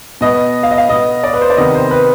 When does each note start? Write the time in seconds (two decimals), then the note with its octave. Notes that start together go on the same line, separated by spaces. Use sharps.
0.21 B2 B3 D#5
0.63 F5
0.71 D#5
0.78 F5
0.89 B2 B3 D#5
1.23 D5
1.34 B4
1.41 C5
1.50 D5
1.57 C3 D#3 B3 D#5
1.75 C5
1.91 B4